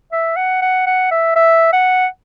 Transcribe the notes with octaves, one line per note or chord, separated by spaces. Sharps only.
E5
F#5
F#5
F#5
E5
E5
F#5